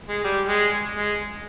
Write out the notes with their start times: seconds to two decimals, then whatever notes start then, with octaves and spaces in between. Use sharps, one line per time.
0.08 G#3
0.24 G3
0.48 G#3
0.96 G#3